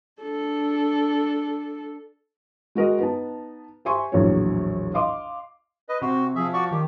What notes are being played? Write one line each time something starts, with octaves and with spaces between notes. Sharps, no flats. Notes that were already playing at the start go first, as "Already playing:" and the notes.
D4 A4
G#3 F#4 A#4 D#5
B3 D#4 A5
G4 C5 E5 G#5 C6 C#6
A#1 E2 A2 F#3 G#4 C#5
D#5 F5 C6 D6
B4 D#5
C3 C4 F#4
F3 G#4 E5
F#4 D5 C#6
D#3 G4